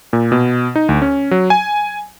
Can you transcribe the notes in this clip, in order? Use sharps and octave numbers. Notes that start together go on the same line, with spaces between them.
A#2
B2
D#4
D2
C#4
F#3
G#5